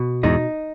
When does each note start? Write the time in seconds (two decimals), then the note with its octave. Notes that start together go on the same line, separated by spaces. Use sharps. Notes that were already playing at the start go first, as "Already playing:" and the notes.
Already playing: B2
0.23 E2 G#2 D#4